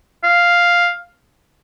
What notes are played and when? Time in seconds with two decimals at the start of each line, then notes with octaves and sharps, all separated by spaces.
0.24 F5